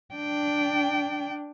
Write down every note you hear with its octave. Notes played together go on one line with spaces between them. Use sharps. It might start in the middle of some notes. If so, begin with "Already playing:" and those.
D4 G5